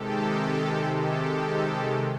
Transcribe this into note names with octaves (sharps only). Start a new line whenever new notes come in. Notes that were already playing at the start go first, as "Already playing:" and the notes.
Already playing: C3 D#3 G#3 G4 A4
G4 A4